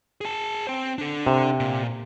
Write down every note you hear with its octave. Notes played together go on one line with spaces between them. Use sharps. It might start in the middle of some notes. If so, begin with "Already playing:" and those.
G#4 A5
C4 C5
D4 A4
C3
A#2